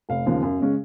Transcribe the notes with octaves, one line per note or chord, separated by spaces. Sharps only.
F1 F5
D#2 C#3 F3
F#2
C#3 G#3 C#4